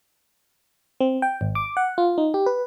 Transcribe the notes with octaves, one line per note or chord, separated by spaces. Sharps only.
C4
G5
G#1
D6
F#5
F4
D#4
G4
B4